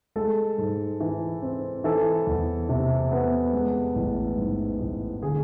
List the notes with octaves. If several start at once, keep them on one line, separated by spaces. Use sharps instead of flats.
G#3 A4
G#2
E3
C4
E3 A4
E2
C3
B3
G#3
A1
G#2
A1
D3 G#4